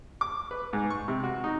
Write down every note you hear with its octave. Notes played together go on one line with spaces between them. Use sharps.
D6
B4
G#2
C#6
C3
F#4
D#4